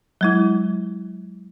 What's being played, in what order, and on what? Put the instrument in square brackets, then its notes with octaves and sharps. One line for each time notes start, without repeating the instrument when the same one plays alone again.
[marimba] F#3 G#3 E4